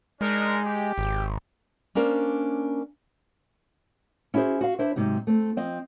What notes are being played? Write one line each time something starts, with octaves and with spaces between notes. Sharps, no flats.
G#3 D4 D#4 A#4
G4
G#1
A#3 C#4 D4 A#4 C5
C#4 E4 F#4 G#4 C5
F#4 F5
D4 E4 B4 C5 E5
G#2 C3 F#3 D#4
A3 C4
F3 C4 D#5